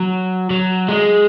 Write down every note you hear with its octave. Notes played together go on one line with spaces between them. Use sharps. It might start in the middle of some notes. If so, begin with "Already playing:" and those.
Already playing: F#3
F#3
G#3